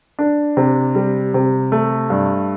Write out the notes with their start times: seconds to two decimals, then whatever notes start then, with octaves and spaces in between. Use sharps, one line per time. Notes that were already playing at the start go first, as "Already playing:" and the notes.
0.19 D4
0.57 C3
0.95 G3
1.34 C3
1.72 A3
2.10 G2